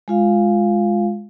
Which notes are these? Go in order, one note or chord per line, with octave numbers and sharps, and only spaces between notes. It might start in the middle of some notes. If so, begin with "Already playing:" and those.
G#3 F4 F5